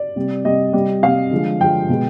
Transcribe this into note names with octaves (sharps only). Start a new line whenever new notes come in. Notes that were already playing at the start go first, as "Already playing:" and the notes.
Already playing: D5
C3 G3
C3 G3 D#5
C3 G3
C3 G3 F5
D3 F3 G#3
D3 F3 G#3 G5
B2 G#3